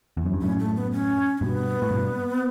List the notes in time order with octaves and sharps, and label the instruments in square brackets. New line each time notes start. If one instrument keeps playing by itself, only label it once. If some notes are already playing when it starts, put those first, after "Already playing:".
[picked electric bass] E2
F#2
G2
[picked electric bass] F#2 A2 [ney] C#4
[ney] A3
B3
C#4
C#4
[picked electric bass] G2 B2 [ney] B3
[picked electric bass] A2
G2 B2